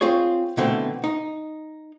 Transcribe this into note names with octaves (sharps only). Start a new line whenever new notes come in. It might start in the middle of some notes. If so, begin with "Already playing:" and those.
C4 F4 G#4 C#5
B2 D3 E3 A3 C4
D#4